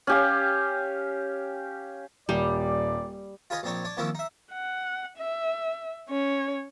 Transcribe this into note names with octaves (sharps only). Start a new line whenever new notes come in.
C#4 G4 F5
D#1 G3 D5
F4 G#4 B4 C#5 D#5
A#1 C4 D4 D#4 C#5
D4 C#5
D#3 F3 A#3 C4 C#4 E4
D#4 E5
F#5
E5
C#4 C#5